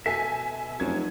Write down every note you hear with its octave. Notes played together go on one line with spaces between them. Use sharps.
B2 A4 E5 G#5
F1 F#2 G#6